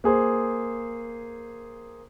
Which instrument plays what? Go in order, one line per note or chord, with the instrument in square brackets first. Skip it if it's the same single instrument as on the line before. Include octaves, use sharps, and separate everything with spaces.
[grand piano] A#3 G#4 C5